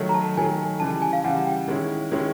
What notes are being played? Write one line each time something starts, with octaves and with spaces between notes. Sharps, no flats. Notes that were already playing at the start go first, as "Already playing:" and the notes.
Already playing: D#3 F#3 A3
A#5
A5
D#3 F#3 A3 G#5
C#3 E3 G3 A5
A5
G#5
F5
C#3 E3 G3 F#5
G5
D#3 G#3 C#4 E4
D#3 G#3 C#4 E4